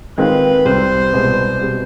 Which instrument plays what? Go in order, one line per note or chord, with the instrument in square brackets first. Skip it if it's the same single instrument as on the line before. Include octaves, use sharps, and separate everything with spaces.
[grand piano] D#3 G#3 C4 F4 [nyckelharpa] B4
[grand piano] C2 C3 G3 [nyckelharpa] C5
[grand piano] C2 B2 G#3 B3
B2 G3 C4